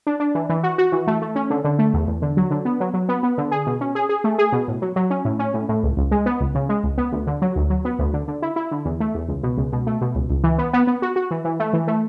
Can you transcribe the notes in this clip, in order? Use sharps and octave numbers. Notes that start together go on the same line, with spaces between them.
D4
D4
E3
E3
F#4
F#4
E3
A3
A3
C#4
D3
D3
A3
E2
E2
D3
F#3
D3
B3
F#3
F#3
B3
B3
D3
G#4
B2
C#4
G#4
G#4
A3
G#4
B2
A2
F#3
F#3
C#4
A2
C#4
A2
A2
C#2
C#2
G#3
B3
C#2
C#3
G#3
C#2
B3
D2
D3
F#3
D2
F#3
B3
D2
D3
D3
E4
E4
D3
E2
A3
E2
C#2
B2
C#2
B2
A3
B2
C#2
C#2
E3
B3
B3
B3
F#4
F#4
E3
E3
A3
E3
A3